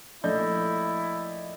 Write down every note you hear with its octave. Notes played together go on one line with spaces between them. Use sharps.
A#1 A3 E4 D5 D#5 G6